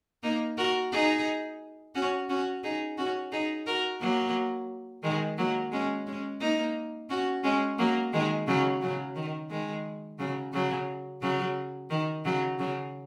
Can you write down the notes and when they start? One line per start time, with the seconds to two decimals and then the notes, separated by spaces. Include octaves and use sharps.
0.23 A#3 D#4
0.57 F#4 A#4
0.92 D#4 G#4
1.95 C#4 F#4
2.29 C#4 F#4
2.63 D#4 G#4
2.98 C#4 F#4
3.32 D#4 G#4
3.67 F#4 A#4
4.00 F#3 A#3
5.03 D#3 G#3
5.38 F#3 A#3
5.72 G#3 C#4
6.07 G#3 C#4
6.41 A#3 D#4
7.09 C#4 F#4
7.44 G#3 C#4
7.78 F#3 A#3
8.13 D#3 G#3
8.47 C#3 F#3
8.81 C#3 F#3
9.16 D#3
9.50 D#3 G#3
10.19 C#3 F#3
10.53 C#3 F#3
11.21 C#3 F#3
11.90 D#3
12.25 C#3 F#3
12.59 C#3 F#3